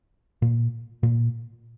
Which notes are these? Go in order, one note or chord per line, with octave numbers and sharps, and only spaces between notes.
A#2
A#2